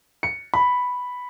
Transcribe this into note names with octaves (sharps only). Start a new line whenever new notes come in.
C#7
B5